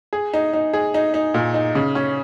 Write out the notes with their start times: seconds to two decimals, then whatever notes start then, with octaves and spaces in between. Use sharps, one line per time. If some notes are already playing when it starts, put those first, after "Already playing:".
0.13 G#4
0.34 D#4
0.53 D#4
0.73 G#4
0.94 D#4
1.14 D#4
1.34 A#2
1.54 D#4
1.75 C#3
1.95 C#4